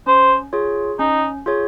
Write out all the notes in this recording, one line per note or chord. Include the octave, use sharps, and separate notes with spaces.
C#4 C5
F4 G#4 C#5
C#4 D#4
F4 G#4 C#5